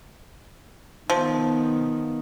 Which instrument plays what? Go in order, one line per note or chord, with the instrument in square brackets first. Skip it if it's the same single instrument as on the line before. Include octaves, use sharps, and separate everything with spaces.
[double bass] D#3 B3 [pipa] F3